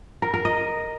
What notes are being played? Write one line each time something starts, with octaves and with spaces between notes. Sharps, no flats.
A#4
A#4
D#5